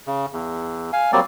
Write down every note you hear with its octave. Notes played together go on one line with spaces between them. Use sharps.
C#3
E2
F5 G#5
F#3 G3 A#3 C4 D5